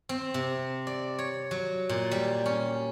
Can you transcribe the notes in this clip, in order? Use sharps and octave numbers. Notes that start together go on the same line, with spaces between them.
C4
C3
D5
C#5
F#3
A#2
G3
C#4